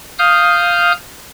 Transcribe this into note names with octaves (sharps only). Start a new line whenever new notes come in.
F5 D#6 F6 G6